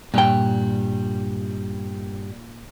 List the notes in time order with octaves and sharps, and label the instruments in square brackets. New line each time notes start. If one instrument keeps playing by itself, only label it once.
[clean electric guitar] G2 G3 [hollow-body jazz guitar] A#2 G5